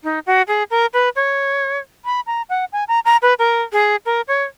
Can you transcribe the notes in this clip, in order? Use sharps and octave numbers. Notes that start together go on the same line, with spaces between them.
D#4
F#4
G#4
A#4
B4
C#5
B5
A#5
F#5
G#5
A#5
A#5
B4
A#4
G#4
A#4
C#5